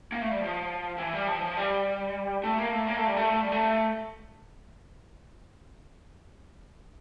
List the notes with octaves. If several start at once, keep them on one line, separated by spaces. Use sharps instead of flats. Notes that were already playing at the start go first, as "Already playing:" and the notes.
A#3
A3
G3
F3
E3
G3
F3
E3
F3
G3
A3
A#3
A3
A#3
A3
G3
A3
A3
G3
A3